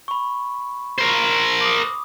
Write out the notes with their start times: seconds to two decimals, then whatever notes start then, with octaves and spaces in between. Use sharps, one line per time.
0.08 B5 C#6
0.98 A#4 C5
1.61 D6 D#6